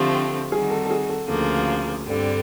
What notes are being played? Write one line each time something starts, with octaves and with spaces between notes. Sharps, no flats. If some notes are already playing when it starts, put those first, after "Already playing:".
Already playing: D3 F3 A3 C4 G4
D#3 G3 C4 D#4 F#4 G#4
A4
A4
G#4
A4
D2 C#3 F3 A#3 A4
G2 D3 G3 C4